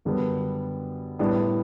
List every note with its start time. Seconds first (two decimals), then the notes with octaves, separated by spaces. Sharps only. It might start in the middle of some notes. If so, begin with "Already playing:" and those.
0.05 F#2 D3 G3 B3
1.19 A2 G3 B3 D4